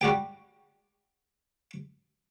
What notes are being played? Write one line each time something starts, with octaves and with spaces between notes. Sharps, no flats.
G3 F#4 G4 G5